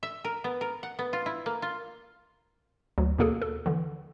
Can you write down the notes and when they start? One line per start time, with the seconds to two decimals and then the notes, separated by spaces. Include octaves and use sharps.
0.03 E5
0.24 A#4
0.44 B3
0.61 A#4
0.83 F#5
0.99 B3
1.13 F4
1.26 E4
1.46 A#3
1.62 F4
2.98 D2 F#3
3.19 D#2 B2 A#3 G#4 A4
3.42 A4
3.66 D3 E3